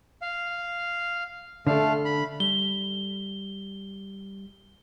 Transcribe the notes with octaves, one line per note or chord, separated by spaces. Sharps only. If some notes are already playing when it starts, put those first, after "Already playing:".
F5
D3 A3 D4 A4 F5
B5
G3 G7